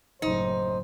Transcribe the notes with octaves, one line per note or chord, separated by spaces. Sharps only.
F#1 A2 D#4 C5